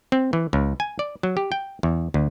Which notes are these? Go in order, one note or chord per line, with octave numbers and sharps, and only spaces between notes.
C4
E3
C#2
G#5
D5
F#3
G4
G5
E2
D2